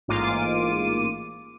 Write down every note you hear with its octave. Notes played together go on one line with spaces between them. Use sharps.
A1 G#2 A#3 F4 D6 D#7